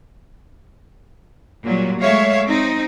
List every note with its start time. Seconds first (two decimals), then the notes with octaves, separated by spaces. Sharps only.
1.64 A#2 F#3 G3
2.01 G#3 A3 C#5 E5 F5
2.45 C4 D#4